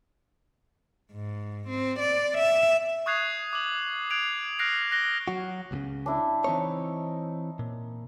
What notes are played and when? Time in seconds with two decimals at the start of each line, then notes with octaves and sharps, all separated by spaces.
1.13 G#2
1.68 C4
1.99 D5
2.37 E5
3.06 C#6 D#6 F#6 G#6 C7 F7
3.53 D6 F#7
4.10 F#6 G#6 C7 D7 F7
4.59 F6 F#6 A#6 C7 D7
4.91 F#6 A#6 G7
5.28 F#3 F#4
5.71 C#2 A#2 C#3
6.06 D4 E4
6.44 E3 C4 D#4 C#5
7.59 A#2